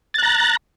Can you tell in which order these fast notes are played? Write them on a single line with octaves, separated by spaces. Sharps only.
A6 F#6 A#5